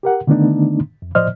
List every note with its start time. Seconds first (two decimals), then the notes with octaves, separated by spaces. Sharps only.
0.03 G4 A#4 F#5
0.27 D3 D#3 A3 B3 D4 D#4
1.02 F2
1.15 A2 F3 C5 D5 D#5 F6